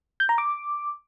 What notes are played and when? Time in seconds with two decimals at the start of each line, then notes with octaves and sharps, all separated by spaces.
0.20 G6
0.29 A#5
0.38 D6